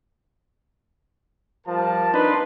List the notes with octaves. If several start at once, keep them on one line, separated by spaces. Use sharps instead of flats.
F3 G3 A#4 A5
C4 D4 D#4 B4 A5 C6